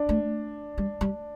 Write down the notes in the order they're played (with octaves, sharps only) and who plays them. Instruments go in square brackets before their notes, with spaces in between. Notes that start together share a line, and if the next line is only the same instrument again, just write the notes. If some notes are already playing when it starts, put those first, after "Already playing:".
Already playing: [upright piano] D4
[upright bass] A3
G3
G3